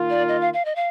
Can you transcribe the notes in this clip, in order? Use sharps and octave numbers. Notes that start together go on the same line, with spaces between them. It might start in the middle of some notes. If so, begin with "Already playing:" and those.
Already playing: D#3 A#3 F4
D5
D#5
F5
F5
D#5
F5